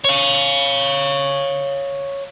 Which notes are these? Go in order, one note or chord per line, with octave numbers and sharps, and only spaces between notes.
C#5 F5